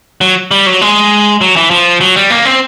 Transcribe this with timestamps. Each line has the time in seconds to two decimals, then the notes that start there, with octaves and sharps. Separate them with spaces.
0.21 F#3
0.51 G3
0.67 F#3
0.81 G#3
1.41 F#3
1.56 E3
1.71 F3
2.01 F#3
2.16 G3
2.30 A#3
2.45 C4